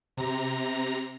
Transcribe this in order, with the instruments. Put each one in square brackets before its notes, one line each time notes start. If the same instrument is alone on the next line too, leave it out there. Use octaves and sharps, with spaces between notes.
[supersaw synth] C3 A#5